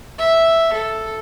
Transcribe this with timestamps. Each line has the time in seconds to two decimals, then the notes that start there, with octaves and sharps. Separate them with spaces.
0.18 E5
0.73 A4